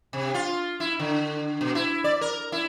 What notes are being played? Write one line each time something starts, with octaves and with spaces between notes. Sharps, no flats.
C3
F4
E4
D3
B2
E4
D5
A#4
E4